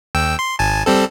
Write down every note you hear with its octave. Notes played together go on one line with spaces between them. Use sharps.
D#2 G5 E6
C6
G#1 G#5 A5
G3 C4 A4